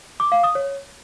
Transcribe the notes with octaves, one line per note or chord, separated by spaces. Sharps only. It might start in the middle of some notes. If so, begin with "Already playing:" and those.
D6
F5
D#6
C#5